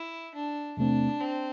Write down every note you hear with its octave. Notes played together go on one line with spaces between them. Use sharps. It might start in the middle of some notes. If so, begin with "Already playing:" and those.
Already playing: E4
D4
E2 C3 A3 C4 D4
C4